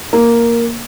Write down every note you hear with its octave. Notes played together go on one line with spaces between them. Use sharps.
A#3